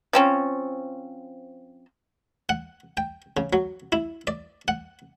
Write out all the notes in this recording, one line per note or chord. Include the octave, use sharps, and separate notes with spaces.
F3 C4 C#4
F#5
G5
C#3
F#3
E4
D5
F#5